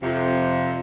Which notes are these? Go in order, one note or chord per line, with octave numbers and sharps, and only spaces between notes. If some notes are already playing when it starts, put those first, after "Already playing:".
F2 C3